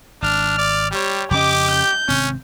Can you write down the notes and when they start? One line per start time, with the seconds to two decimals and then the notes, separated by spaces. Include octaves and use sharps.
0.22 G#1 D4 F6
0.58 D5
0.91 G3 G4 C#5
1.31 F2 C#3 C#4 G4 D#5 D6
1.70 G6
2.08 G#1 C3 C4 C#4